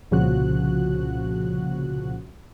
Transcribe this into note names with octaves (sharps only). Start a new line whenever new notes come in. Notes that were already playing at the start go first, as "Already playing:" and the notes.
C2 A#2 C#3 F3 F#4 F#6